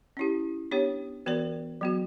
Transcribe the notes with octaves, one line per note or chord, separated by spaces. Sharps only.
C#4 E4 G4
B3 D4 G4 C#5
E3 B3 F#4 A#4 D5
F#3 B3 F#4